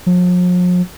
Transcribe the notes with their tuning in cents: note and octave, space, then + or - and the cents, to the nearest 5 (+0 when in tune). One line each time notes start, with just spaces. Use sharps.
F3 +45